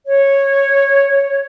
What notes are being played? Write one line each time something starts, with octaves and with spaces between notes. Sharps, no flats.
C#5